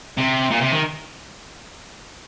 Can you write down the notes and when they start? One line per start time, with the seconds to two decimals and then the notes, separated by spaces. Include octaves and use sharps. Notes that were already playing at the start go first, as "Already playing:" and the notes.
0.18 C3
0.51 A#2
0.61 C3
0.72 D#3